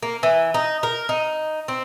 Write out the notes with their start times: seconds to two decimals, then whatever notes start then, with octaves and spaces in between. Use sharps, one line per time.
0.02 A#3
0.23 E3
0.54 D#4
0.83 A#4
1.09 D#4
1.68 C4